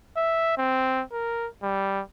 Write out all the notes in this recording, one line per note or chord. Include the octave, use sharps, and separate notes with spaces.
E5
C4
A#4
G3